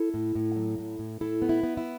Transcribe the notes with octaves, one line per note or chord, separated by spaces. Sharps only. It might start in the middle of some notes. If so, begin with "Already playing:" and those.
Already playing: E4 A4
A2
A2
F#3
A2
A2
A2 E4 A4
B3
E4
B3
E4